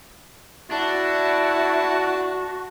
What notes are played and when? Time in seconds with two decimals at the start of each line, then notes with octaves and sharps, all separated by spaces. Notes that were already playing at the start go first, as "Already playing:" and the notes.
0.71 D4 E4 F#4 A5